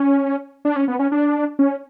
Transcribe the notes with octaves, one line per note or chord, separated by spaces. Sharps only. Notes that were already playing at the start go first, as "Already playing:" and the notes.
Already playing: C#4
D4
C#4
B3
C#4
D4
C#4